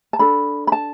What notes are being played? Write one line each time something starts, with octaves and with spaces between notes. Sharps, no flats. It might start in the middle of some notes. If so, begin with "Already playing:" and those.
A5
D4 A4 B5
B5
A5